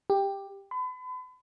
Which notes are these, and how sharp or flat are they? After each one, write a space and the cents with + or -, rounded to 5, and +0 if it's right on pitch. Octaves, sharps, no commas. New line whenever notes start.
G4 +10
B5 +40